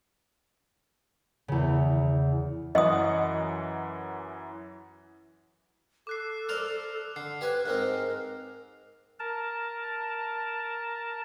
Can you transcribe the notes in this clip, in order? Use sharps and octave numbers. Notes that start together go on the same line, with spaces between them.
E2 C#3
F#2 E3 D#5 F#5 D#6
A4 D6 F#6 C7
A#4 C5 D5 F6 F7
D3 C7
G4 B4 C5 G#5
G#2 G#3 C4 A#4
A#4 A5